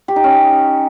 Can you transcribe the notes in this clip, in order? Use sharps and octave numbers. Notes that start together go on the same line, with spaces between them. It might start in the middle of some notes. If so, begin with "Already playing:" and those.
G4
D#4
C#4